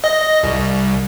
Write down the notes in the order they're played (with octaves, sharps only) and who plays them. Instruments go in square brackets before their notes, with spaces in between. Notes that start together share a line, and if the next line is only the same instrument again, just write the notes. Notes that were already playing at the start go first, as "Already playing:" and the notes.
[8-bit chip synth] D#5
C2